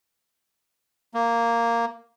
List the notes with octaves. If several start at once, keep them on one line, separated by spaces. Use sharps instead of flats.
A#3